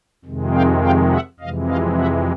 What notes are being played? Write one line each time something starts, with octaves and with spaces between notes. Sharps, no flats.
F2 C3 D#3 G#3
F5 G5
F5 G5
E5 F#5
F2 C3 E3 G#3 D#5 F5
D#5 F5
E5 F#5